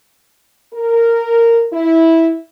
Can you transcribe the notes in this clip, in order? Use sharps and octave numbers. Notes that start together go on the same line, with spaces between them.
A#4
E4